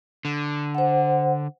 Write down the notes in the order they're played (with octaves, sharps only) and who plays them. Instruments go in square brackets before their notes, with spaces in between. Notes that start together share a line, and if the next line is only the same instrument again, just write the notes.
[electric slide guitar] D3
[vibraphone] C5 F#5